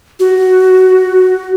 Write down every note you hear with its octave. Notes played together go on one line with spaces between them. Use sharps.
F#4